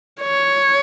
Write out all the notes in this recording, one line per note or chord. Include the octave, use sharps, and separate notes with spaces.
C#5